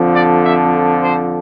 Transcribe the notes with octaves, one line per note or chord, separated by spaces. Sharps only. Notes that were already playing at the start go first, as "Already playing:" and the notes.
Already playing: F2 D3 F3
D5
E5
C5